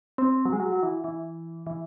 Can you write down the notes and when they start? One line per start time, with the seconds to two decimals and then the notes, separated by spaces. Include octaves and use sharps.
0.18 C4
0.45 F#3
0.53 G#3
0.60 F#3
0.72 F#3
0.83 E3
1.04 E3
1.67 E3